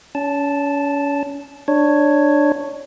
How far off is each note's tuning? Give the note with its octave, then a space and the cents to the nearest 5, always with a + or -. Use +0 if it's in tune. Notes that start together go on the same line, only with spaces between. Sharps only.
C#4 +35 A5 -5
D4 +15 C#5 +0